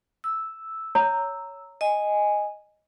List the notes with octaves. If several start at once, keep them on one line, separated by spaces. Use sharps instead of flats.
E6
C#5 A#5
D#5 G#5